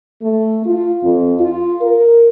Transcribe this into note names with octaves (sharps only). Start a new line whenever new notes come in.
A3
F4
F2
F4
A#4